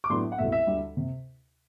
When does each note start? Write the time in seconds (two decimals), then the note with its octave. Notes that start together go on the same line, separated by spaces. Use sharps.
0.04 D6
0.10 A2 F#3 B3 D4 C6
0.32 F#5
0.38 C2 B2 A3 E5
0.52 E5
0.67 D2 D3 G3
0.97 C3